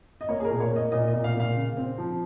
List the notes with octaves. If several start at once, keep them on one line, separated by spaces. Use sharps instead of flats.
D#5
A#3 C#5
G#4
A#4
A#2
C#5
A#3 D#5
A#2 D#5
D#5
A#2
F5
A#2
F5
C#3
C4
F3